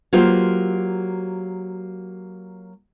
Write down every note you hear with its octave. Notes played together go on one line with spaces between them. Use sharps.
F#3 A#3 F4 G4 C5